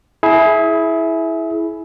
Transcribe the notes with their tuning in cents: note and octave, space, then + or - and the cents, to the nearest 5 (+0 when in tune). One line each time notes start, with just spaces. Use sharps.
E4 -5 G#4 +25